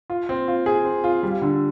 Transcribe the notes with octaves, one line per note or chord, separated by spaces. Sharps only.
F4
C4
F4
G#4
C4
F4
G3
D3